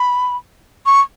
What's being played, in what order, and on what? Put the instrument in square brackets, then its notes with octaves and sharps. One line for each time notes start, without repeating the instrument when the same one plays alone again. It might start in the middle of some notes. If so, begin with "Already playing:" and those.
Already playing: [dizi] B5
C#6